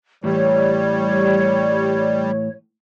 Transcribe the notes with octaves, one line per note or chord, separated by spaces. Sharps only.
A2 E3 G3 C#5